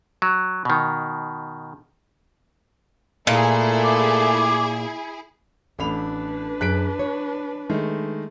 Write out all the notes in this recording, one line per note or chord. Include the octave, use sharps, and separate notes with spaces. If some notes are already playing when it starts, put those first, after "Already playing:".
F#3
B2 D#3
A#2 A3 E4 G#4
D6
A1 A3 D4 B4 B5 F7
F#2 G#4 F#6 B6 D7
C#5
D#3 G#3 A3